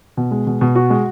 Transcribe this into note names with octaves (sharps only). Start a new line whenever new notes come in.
B2
G#3
B2
B2
F#4
G#3